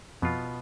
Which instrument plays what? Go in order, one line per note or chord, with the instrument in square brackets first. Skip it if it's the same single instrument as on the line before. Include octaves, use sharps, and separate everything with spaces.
[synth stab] F2 [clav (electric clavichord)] B2 B3 F4